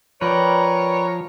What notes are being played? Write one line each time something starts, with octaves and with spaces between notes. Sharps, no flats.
F3 A#4 B4 C#5 D5 G5 A#5